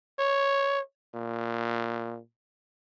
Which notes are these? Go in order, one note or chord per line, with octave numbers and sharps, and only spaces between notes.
C#5
A#2